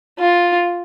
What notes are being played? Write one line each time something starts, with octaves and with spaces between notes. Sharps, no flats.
F4